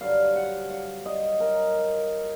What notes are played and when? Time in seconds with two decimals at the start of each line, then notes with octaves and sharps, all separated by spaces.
0.01 G2 D3 F#3 F5
0.36 F#5
0.70 F5
1.06 D#5
1.40 A#4